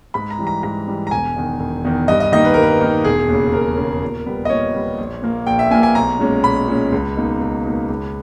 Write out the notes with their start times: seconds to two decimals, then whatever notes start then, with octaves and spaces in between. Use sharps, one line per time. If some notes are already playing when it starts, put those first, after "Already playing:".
0.14 G#2 B5
0.30 A#5
0.39 E3 G3
0.47 A#5
0.63 G#2 A#5
0.88 E3 G3
1.07 A#5
1.11 E1 G#5
1.36 E2 D#3
1.60 E1
1.85 E2 D#3
2.08 G2 D#5
2.20 D#5
2.32 D#3 A#3 D#4 D#5
2.45 B4
2.54 G2 A#4
2.62 B4
2.80 D#3 A#3 D#4
3.04 E1 G#4
3.29 D#2 C#3
3.53 E1 A#4
3.77 D#2 C#3
4.02 A#2
4.26 G3 B3
4.45 D#5
4.50 A#2 C#5
4.74 G3 B3
4.98 A#1
5.22 A#2 A#3
5.47 A#1 G5
5.59 E5
5.71 A#2 G#5
5.75 A#3
5.83 G#5
5.95 B1 A#5
6.19 A#2 G#3 C#4
6.44 B1 B5
6.67 A#2 G#3 C#4
6.92 C#2
7.17 B2 A#3 D#4
7.41 C#2
7.65 B2 A#3 D#4
7.88 C#2